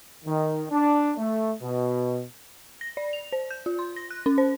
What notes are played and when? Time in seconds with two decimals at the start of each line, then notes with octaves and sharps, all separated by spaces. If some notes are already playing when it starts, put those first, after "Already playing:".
0.25 D#3
0.70 D4
1.17 A3
1.62 B2
2.81 A#6
2.97 D5
3.13 F7
3.32 C5
3.51 G6
3.66 F4
3.79 C6
3.96 A#6
4.11 F#6
4.26 C#4
4.38 C5